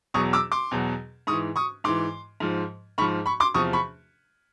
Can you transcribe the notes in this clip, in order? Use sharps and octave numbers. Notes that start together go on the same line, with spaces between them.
E2 B2 F#3 C#6 D#6
D6 E6
C6 D6
E2 B2 F#3
G#2 E3 C#6 D#6
C#6 D#6
G#2 E3 C6 D6
G#2 F3
G#2 F3 B5 C#6
B5 C#6
C6 D6
E2 C3 F3 C#6 D#6
B5 C#6